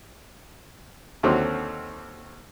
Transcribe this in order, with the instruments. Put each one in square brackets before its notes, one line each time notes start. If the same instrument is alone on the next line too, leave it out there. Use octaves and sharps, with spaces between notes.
[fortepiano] D#2 D3 F#3 C4